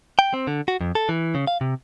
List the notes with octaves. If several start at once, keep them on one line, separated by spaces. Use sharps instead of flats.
G5
C4
D3
F#4
F2
A4
E3
C#3
F5
C3